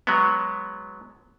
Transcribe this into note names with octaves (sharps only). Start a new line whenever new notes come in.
F#3 G#3 B3